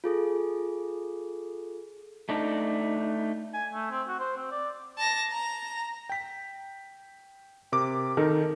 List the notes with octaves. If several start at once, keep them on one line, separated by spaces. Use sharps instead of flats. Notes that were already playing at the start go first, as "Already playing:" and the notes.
F4 G#4 A4
A3 D4 D#4
G#5
A3
C4
F#4
C5
C4
D5
A5 A#6
A#5
G5 B6
C3 A#4 D6
D#3 D#4 A4 A#4